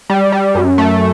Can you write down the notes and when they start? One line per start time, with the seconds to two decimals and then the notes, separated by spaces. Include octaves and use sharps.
0.10 G3
0.32 G3
0.55 F#2
0.78 A3